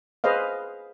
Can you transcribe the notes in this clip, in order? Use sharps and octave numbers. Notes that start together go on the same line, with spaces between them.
G#4 B4 C5 D#5 F5